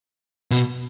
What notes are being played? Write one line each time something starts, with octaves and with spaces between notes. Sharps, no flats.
B2